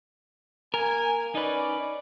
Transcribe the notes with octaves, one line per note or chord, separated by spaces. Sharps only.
A#3 A#4 G#5
C#4 D#4 B4 D5